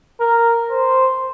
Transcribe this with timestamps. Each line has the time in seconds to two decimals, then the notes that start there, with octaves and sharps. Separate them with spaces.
0.20 A#4
0.71 C5